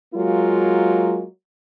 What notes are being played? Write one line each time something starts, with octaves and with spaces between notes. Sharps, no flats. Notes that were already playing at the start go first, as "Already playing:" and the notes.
F#3 G#3 A#3 F4